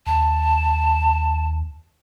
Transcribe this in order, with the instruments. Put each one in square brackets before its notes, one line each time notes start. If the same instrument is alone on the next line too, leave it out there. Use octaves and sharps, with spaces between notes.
[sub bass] D#2 [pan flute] A5